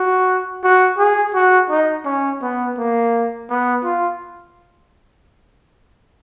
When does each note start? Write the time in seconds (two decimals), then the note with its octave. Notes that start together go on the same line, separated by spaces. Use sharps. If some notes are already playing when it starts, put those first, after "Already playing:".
Already playing: F#4
0.64 F#4
0.98 G#4
1.34 F#4
1.70 D#4
2.05 C#4
2.42 B3
2.77 A#3
3.49 B3
3.84 F4